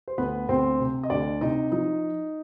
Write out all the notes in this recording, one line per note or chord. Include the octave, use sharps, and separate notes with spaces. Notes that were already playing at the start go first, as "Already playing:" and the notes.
C5
D2 B3 B4
D2 C4 C5
C3
D#5
D2 D4 D5
C3 D#4 D#5
F3 D#4 D#5